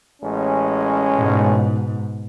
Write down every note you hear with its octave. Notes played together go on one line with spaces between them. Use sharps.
A1 G#3 C#4
G#2 B2